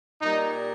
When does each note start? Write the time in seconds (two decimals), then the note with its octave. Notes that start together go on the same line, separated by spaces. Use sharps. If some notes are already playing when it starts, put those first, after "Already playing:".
0.22 A#2 G3 D#4